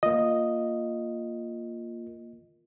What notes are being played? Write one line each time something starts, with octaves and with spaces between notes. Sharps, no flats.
A#3 F4 D#5